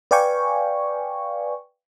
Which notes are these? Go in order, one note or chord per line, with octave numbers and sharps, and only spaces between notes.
B4 D5 F5 G5 G#5 C#6